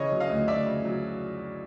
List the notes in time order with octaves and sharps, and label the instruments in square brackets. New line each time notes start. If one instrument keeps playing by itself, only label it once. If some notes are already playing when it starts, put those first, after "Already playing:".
Already playing: [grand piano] C#3 E3 C#5 D#5
F#3
D#5 F5
D2
D2 D5 E5
C#3
F#3